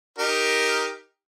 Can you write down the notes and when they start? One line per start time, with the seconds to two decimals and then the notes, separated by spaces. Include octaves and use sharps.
0.18 D#4 G4 A#4